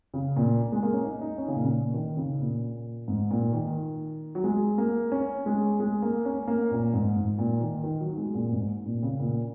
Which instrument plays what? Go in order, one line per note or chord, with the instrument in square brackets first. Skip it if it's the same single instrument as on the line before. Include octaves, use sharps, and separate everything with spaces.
[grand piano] C#3
A#2
G#3
A#3
C#4
D#4
D#4
C#4
C#3
A#2
C#3
A#2
D#3
C#3
A#2
G#2
A#2
D#3
F#3
G#3
A#3
C#4
G#3
G#3
A#3
C#4
A#3
A#2
G#2
G#2
A#2
D#3
D#3
F#3
G#3
A#2
G#2
A#2
C#3
A#2